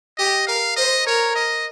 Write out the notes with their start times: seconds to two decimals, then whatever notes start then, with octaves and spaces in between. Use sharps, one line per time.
0.18 G4 D#5
0.47 A#4 F5
0.77 C5 D#5
1.06 A#4 C#5
1.35 D#5